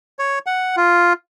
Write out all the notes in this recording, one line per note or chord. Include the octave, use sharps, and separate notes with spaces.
C#5
F#5
F4